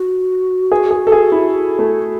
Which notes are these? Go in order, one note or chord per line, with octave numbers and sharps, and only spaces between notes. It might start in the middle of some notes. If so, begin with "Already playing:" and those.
Already playing: F#4
G#4
G#4
A4
G#4
E4
A3